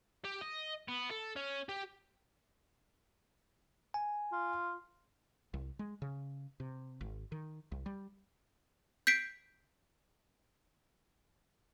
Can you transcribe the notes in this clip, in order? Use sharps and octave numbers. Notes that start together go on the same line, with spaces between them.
G4
D#5
B3
A4
C#4
G4
G#5
F4
C2
G#3
C#3
C3
G#1
D#3
C2
G3
G6 B6 C7 D7